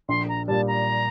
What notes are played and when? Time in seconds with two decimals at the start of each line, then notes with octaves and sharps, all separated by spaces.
0.09 A#1 C6
0.29 A#5
0.48 A#2 G3 A5
0.68 A#5